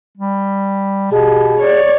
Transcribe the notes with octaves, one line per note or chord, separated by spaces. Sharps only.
G3
B2 G4 G#4
C#5 D5